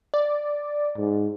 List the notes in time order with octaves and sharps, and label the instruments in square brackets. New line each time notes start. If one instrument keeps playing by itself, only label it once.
[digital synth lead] D5
[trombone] G#2